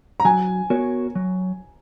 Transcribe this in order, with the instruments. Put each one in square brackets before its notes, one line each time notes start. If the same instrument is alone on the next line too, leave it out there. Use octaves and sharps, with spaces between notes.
[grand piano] A#5
[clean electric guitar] F#3 [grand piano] G#5
[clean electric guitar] B3 F#4 A#4 C#5
F#3